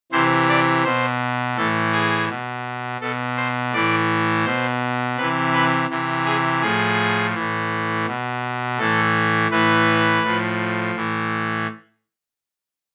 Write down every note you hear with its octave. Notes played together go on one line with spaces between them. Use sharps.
C3 E3 C5
D5
B2 C5
A2 E3 A4
G#4
B2
B2 A4
C5
A2 E3 D5
B2 C5
C3 E3 B4
B4
C3 E3
G#4
A2 F3 G#4
A2 E3
B2
A2 E3 A4
A2 E3 B4
A2 F3
A2 E3